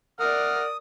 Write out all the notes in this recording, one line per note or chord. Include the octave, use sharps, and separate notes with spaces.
A#4 D5 F#5 D#6 F6